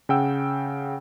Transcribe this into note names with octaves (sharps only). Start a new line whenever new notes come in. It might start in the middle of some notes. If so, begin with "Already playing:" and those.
C#3 F#5 G5 E6